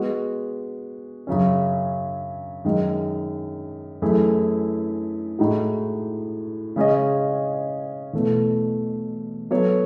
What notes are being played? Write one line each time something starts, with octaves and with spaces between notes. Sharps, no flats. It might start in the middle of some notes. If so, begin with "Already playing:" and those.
Already playing: G#3 B3 F#4
F#2 C#3 F#3 C#4
F#2 D#3 G#3
F#2 E3 A3 E4 G#4
A2 G#3 D#4 F#4
C#3 G#3 C#4 G#4 D#5
E2 B2 A3
F#3 B3 F#4 A4 C#5